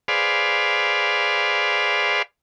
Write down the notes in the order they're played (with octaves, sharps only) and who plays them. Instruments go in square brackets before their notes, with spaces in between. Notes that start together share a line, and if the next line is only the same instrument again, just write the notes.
[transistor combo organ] G#4 B4 C5 D5 F5